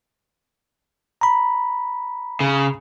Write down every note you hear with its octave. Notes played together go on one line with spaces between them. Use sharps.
A#5 B5
C#3